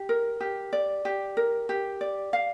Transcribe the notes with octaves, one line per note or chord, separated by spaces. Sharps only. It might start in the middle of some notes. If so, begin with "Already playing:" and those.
Already playing: G4
A#4
G4
D5
G4
A#4
G4
D5
F5